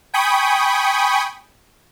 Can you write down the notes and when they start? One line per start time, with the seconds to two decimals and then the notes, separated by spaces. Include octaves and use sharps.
0.14 G5 G#5 B5 C#6 D#6